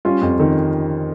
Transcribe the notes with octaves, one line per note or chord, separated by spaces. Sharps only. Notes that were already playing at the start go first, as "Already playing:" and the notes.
G3 C#4 F4
F2
D#3